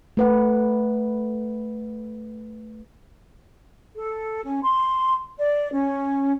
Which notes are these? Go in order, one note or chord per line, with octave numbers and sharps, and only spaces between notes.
A3 B4 F#5
A4
C#4
C6
D5
C#4